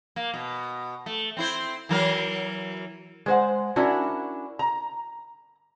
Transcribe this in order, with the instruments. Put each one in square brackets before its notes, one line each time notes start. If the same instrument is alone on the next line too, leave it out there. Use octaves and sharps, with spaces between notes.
[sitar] A#3
B2
A3
C4 E4 C5
E3 F#3 A#4
[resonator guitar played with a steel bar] G#3 C5 F#5
C#4 D4 E4 F#4 A#4
A#5